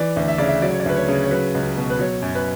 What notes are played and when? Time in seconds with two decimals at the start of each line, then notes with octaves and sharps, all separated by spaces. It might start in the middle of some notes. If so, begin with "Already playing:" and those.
Already playing: E3 D5
0.16 D2
0.28 E5
0.38 C#3 D5
0.48 E5
0.62 F#3 D5
0.71 C#5
0.80 D5
0.86 D2 B4
0.96 C#5
1.08 C#3
1.24 C#5
1.31 F#3 B4
1.55 C#2
1.77 B2
1.90 B4
1.99 F#3 C#5
2.22 F#2
2.35 B4